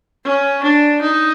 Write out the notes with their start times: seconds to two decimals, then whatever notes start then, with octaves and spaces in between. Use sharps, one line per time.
0.25 C#4
0.63 D4
1.02 D#4